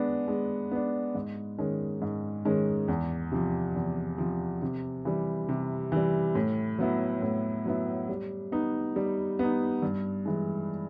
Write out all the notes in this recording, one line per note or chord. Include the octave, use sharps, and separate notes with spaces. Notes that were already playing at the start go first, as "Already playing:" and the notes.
Already playing: G#3 B3 D4
G#3
B3 D4
G#2
D#3 G#3 C#4
G#2
D#3 G#3 C#4
E2
C3 F3
E2
C3 F3
C3
E3 G3
C3
E3 G3
A2
F#3 B3 E4
A2
F#3 B3 E4
G3
B3 D#4
G3
B3 D#4
G2
E3 G#3